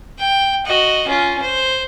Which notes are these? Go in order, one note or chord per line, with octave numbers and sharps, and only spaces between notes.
G5
F#4 D#5
C#4 F4
C5